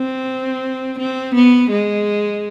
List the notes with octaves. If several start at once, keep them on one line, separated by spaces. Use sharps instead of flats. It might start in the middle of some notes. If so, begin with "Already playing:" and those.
Already playing: C4
C4
B3
G#3